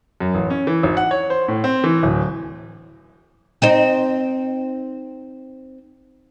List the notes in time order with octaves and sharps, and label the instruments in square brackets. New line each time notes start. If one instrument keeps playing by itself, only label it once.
[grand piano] F#2
A1
C#4
E3
G#1
F#5
C#5
C5
A2
C4
E3
D1
[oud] C4 D#4 C5